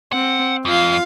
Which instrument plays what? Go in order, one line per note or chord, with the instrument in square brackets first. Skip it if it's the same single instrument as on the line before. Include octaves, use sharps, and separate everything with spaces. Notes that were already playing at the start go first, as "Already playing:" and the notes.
[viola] C4 [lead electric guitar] F#5
[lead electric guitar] F2 [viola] F4 F5